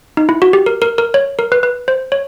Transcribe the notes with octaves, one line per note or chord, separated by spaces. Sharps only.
D#4
E4
F#4
G4
A#4
A#4
A#4
C#5
A#4
B4
B4
C5
C#5